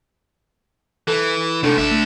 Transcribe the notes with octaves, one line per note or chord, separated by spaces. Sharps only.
E3 A4 A#4
G#2 C3 A3 D4 A4
A1 D4 E5 B6
A3